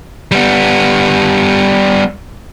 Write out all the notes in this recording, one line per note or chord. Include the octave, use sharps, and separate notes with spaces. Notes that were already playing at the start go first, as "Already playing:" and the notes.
G3 B3